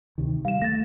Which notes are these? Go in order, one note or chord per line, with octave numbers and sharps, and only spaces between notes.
D2 C3 D#3
G3 F5 E7
A3 A6 A#6